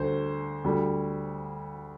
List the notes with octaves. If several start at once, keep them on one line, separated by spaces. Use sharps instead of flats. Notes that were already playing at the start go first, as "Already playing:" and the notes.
Already playing: D2 D3 G3 C5
D2 D3 G3